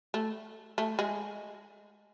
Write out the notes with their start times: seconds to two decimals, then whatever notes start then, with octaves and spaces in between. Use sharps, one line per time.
0.14 A3
0.78 A3
0.99 G#3